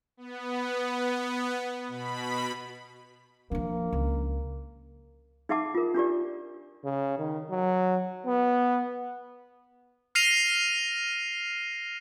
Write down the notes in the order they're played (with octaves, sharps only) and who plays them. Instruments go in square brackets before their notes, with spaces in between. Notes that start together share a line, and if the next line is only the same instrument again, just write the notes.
[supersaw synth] B3
B2 B5
[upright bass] F3 D4 [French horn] A#3
[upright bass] C#2
[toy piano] D#4 G#4 E5 F#5 A5 D6
F4 A#4
D4 F4 G4 D5
[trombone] C#3
D#3
F#3
B3
[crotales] F6 A#6 C7 D#7 F7